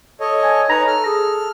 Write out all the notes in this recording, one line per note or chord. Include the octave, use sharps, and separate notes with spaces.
A4 C#5 D#5
G#5
D#4 B4 C#5 A#5
A4 F6
G#4